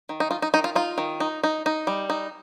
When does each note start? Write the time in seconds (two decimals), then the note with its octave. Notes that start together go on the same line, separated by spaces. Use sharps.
0.09 D#3
0.20 D#4
0.31 D#4 F4
0.42 D#4
0.54 D#3 D#4
0.64 F4
0.75 D#4 F4
0.98 D#3
1.20 D#4
1.44 D#4
1.66 D#4
1.87 G3
2.10 D#4